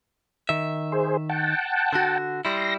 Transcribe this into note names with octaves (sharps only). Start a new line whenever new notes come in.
D#3 E5
G#4 C5
F#5 G5 A5
D3 F#4
G3 E4 C6 A#6